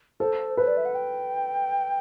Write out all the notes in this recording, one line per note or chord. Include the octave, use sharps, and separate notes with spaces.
A4 C5
B4 C5
D5
E5
F#5
G5